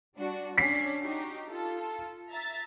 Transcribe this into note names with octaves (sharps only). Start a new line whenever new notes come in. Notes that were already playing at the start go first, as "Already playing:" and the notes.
G3 D4 F#4
C#4 D4 B6 C7
D#4 F#4 G4
F4 A4
E5 A#5 A6